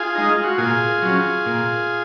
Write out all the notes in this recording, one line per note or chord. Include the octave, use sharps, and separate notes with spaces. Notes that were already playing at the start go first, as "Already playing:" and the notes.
Already playing: F4 G#4
G#3 D#4
F4
F#4
A#2 F4 G#4
F#3 C#4
A#2